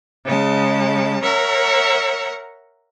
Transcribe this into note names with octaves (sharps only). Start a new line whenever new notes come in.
C#3 G#3 A5
A#4 C#5 E5 F#5 A#5